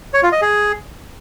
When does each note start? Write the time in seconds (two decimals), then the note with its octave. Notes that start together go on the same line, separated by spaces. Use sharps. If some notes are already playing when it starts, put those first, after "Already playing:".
0.14 C#5
0.23 F4
0.32 D#5
0.42 G#4